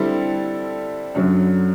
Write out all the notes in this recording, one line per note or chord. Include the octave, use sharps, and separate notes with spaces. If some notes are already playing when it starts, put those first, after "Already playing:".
Already playing: D3 G3 C4 E4 A4
F#2 D3 F#3